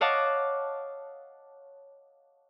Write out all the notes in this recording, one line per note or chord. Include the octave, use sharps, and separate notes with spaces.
C#5 D#5 F5 F#5 A5 D6